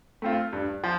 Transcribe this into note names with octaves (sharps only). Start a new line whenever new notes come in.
A3 C4 F4
G2
F3